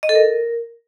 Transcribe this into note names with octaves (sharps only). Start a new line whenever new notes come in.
D#5
A4
A#4